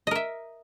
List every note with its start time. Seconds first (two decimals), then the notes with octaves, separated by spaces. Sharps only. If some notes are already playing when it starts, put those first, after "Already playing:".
0.07 D#5
0.11 A#4
0.15 E5